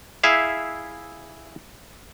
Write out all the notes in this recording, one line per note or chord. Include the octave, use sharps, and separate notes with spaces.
E4 G#4 E5 F5